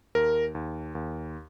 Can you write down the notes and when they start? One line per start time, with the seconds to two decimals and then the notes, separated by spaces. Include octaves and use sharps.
0.15 D#2 A#4
0.55 D#2
0.95 D#2